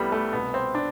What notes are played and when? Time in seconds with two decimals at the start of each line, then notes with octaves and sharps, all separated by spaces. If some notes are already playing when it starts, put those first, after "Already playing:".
Already playing: C2 C3 E3 G3 A3 B3
0.12 A3
0.33 C2 B2 B3
0.54 C4
0.75 D4